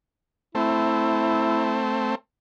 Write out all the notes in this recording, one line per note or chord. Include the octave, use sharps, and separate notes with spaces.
A3 C4 E4